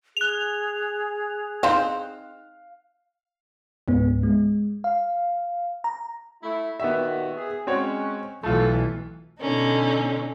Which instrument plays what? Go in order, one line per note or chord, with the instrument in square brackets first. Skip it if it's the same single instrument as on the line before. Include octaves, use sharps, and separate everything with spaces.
[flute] G#4 [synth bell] F#6 F7
[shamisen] C4 D#4 [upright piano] F5
[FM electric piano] C#2 G#2 B3
G#3
F5
A#5
[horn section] A3 E4
[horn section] A#2 D#3 F#4 [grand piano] B3 G4 E5
[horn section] G#4
[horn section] G#3 C#4 [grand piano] C4 F#4 C#5
[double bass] B1 E3 [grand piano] A3 F4 [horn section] A4
[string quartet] B2 D3 C#4 D#4